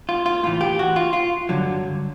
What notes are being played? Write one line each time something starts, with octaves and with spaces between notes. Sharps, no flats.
F4
F4
A2 E3 F4
G4
F#4
F4
F4
G2 D3 F#3